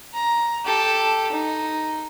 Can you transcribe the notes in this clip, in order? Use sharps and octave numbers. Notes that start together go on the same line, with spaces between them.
A#5
G4 A4
D#4